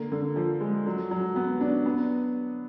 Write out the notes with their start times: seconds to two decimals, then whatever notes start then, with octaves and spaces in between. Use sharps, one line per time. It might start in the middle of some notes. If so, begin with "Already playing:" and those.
Already playing: D3 A#3
0.12 D3
0.36 F3
0.61 G#3
0.86 F#3
1.11 F#3
1.36 B3
1.61 D4
1.86 B3